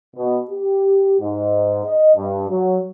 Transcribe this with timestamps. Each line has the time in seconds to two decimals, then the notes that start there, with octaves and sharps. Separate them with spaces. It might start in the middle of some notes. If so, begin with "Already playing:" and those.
0.16 B2
0.51 G4
1.20 G#2
1.85 D#5
2.16 G2
2.50 F#3